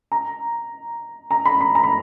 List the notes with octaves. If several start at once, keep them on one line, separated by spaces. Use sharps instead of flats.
A#5
A#5
B5
B5
A#5
B5